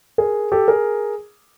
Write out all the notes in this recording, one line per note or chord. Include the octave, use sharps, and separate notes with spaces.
G#4 A#4
G4 A4
G#4 A#4